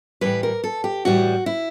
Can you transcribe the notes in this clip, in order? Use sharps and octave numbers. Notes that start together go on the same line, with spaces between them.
A2 E3 G3 B4
A#4
A4
G4
A2 E3 G3 F#4
E4